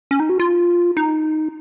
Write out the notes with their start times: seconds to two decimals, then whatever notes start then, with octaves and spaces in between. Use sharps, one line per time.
0.11 C#4
0.20 D#4
0.29 F#4
0.40 F4
0.97 D#4